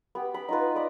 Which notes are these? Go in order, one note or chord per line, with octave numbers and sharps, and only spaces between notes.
B3 G4
B5
D#4 F4 B4
D5 B5 D#6